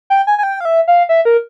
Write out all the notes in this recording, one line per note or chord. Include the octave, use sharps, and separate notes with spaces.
G5
G#5
G#5
G5
F5
E5
F5
E5
A#4